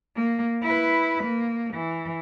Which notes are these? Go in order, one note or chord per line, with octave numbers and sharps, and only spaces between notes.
A#3
E4 B4
A#3
E3